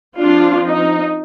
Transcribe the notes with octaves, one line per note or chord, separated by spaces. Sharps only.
F3 C4 D4 F4
D#4